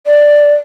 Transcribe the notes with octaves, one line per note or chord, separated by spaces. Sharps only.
D5